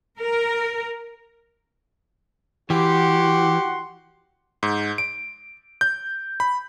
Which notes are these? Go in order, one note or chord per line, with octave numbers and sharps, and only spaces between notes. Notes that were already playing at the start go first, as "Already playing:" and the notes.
A#4
E3 F#4 G4 F#5 C6
G#2
D7
G6
B5